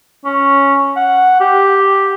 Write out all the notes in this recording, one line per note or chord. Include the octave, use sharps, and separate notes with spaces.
C#4
F#5
G4